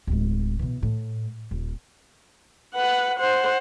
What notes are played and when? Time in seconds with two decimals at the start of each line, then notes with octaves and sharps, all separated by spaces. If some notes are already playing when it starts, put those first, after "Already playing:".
0.07 D1 G#3
0.59 B2 E3
0.83 A2
1.51 D#1
2.75 B4 F#5
3.19 C5 F#5